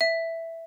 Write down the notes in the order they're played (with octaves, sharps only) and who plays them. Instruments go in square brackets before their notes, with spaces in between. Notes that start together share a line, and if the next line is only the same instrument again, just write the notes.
[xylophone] E5